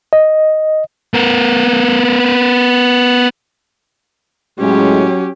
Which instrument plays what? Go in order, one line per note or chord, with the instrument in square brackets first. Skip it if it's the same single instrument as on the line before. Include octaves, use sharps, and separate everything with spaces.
[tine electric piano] D#5
[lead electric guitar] B3 A#4
[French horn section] A2 G#3 [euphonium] F#3 [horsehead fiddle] C#4 G4